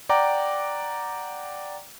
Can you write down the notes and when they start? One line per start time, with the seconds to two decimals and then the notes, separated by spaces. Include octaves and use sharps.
0.09 D5 F#5 G5 A#5 D6